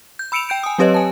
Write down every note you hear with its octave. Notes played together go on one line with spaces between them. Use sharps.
G6
B5 E6 C#7 D7 E7 F7
G5 G6 D7
G#5 D#6
F#3 C4 G4 B4 C#5 D#5
G#5 A5